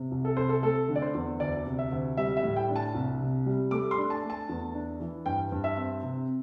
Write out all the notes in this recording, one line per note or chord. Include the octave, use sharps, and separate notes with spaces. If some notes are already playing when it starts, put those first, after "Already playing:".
Already playing: C3
C2
A4
C3 C5
A4
A3 A4
D3
D5
C5
E2
D2 D5
C3
E5
D2
G3 E5
E5
A2
G5
D4
A5
C2
C3
G3
A3 D6
C6
D4
A5
A3
A5
E2
D4
E3
G2 G5
G2
E5
C4
C3